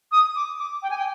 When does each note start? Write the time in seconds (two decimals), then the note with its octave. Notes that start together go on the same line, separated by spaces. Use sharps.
0.12 D#6
0.36 D6
0.59 D6
0.83 G5
0.90 G#5
0.98 G5